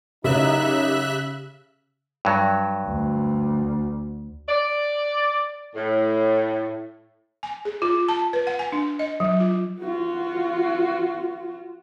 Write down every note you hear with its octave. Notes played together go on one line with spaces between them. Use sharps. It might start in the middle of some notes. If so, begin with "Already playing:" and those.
F#2 C#3 C#4 D#4 G4 E5 F#6
G2 F#3
D2
D5
A2
G#5
G#4
F4
A5
B4
F#5
G#5
D4
D#5
F#3
F4
F4 F#4